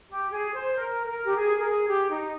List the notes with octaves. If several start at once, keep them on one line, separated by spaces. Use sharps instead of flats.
G4
G#4
C5
A#4
A#4
G4
G#4
A#4
G#4
G4
D#4